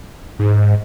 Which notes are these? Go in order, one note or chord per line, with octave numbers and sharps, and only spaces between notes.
G#2